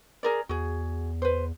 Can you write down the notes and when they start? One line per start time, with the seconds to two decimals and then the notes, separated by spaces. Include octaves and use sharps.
0.23 G#4 A#4 D5
0.49 E2 F#4 G#4
1.22 B4 C5